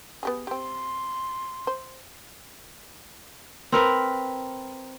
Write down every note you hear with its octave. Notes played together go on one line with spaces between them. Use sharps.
B3 G4 G#4
C4 G4 C6
C5
C4 A#4 B4